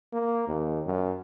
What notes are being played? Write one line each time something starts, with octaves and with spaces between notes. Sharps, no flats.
A#3
D#2
F#2